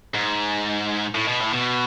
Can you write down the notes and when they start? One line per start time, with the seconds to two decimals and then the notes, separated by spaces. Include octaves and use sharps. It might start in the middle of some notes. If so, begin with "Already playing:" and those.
0.14 G#2
1.15 A2
1.28 B2
1.41 A2
1.54 B2